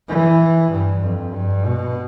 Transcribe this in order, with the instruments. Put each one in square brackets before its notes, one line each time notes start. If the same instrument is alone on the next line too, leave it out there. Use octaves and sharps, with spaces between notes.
[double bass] E3
G2
F2
G2
B2